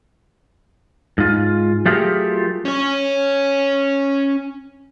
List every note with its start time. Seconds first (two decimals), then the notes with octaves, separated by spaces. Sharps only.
1.18 G#2 F4
1.86 F#3 A3 F4 G4 G#4 A#4
2.65 C#4 C#5